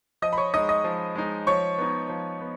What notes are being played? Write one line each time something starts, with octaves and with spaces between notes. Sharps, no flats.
F3 D#5 D#6
B5
C#5 C#6
G#3 D#4 D#5 D#6
D#5 D#6
F3
G#3 D#4
F3 C#5 C#6
B3 D#4
F3
B3